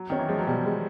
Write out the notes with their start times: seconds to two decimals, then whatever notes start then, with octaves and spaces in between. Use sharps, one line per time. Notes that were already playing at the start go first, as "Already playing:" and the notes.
Already playing: F#3
0.10 D#3 C#4
0.19 E3
0.29 F3 G#3
0.38 F#3
0.47 B2 G3
0.66 G#3